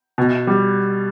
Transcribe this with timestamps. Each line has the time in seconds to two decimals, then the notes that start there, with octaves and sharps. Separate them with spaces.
0.18 B2
0.47 G3